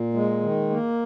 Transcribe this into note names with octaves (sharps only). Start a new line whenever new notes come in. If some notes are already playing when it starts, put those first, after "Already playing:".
Already playing: A#2
G#3
D#3
A#3